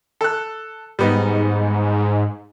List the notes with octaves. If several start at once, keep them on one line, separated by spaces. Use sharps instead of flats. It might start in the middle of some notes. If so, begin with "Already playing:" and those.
A4 F#6
G#2 G3 B3 D#4